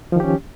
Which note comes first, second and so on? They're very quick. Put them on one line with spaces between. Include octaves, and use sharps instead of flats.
F3 D#3 G4 C#4